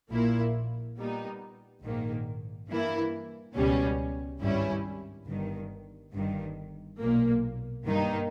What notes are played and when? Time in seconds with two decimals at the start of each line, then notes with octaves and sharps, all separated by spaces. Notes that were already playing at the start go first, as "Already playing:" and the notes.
0.10 A#1 A#2 A#3 E4
0.96 A#2 G3 B3 D#4
1.81 A#1 G#2 D#3 A#3
2.68 G2 E3 A#3 E4
3.54 C#2 B2 G3 C#4
4.40 G#1 G2 G3 C#4 E4
5.26 G1 G2 D#3
6.13 G1 G2 D#3
6.99 B1 A#2 A#3
7.85 G2 D#3 A#3 D#4